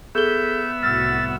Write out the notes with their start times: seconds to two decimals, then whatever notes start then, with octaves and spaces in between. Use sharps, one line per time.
0.15 B3 G#4 A4 E5 G6 G7
0.83 C2 A2 F#4 E6 F6 A6